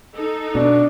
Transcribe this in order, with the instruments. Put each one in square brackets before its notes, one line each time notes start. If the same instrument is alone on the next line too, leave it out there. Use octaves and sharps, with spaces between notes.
[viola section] D#4 A4
[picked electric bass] B2 [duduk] D4